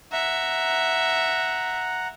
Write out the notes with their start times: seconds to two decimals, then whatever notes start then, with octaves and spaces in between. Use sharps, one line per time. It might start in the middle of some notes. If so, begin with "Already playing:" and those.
0.12 E5 F#5 A#5